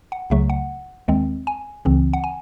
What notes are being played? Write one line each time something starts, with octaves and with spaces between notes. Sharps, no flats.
F#5
C#2 C#3 F#3 A3 E5
F#5
D#2 D#3 G#3 C4
G#5
C#2 C#3 E3 C4
F#5
G#5